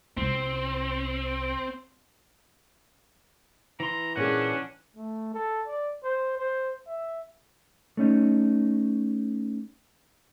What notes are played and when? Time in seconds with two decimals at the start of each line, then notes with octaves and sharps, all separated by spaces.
0.17 C2 C4 F4
3.80 E3 A#5 C6
4.16 A#2 C#4 D4 F4 G#4 F#5
4.97 A3
5.34 A4
5.68 D5
6.04 C5
6.38 C5
6.88 E5
7.97 A3 C#4 D#4